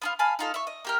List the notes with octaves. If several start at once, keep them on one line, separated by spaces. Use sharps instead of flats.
B3 D4 F4
F5 G#5 A5 B5
D#4 F4 A4
E5 C#6
D#5
A#3 G4 A#4